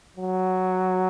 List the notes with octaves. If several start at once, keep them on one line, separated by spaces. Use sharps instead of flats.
F#3